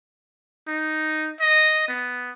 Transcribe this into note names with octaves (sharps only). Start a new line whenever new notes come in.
D#4
D#5
B3